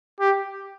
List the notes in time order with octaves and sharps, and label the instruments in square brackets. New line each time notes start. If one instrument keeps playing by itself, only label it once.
[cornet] G4